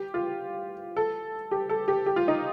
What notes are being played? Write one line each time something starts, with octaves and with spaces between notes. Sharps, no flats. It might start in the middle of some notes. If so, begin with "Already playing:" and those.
Already playing: G4
F4
A4
G4
A4
G4
G4
F4
D#4